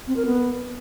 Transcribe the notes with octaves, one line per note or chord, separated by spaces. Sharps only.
C4
A#4
B3